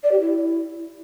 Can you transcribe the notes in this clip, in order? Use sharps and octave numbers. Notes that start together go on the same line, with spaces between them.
D5
G4
E4